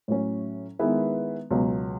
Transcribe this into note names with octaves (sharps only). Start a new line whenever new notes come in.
A2 F#3 C#4
D#3 G#3 B3 E4 B4
C#2 B2 F#3